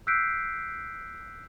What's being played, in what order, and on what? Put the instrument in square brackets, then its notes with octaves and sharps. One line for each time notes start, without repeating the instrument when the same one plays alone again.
[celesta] E6 F#6 G6 B6 C7 D7